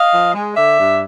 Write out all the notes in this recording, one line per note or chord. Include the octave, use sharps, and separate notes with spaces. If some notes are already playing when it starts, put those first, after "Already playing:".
Already playing: D#5 F5
F3
G#3
D3 D5 E5
G2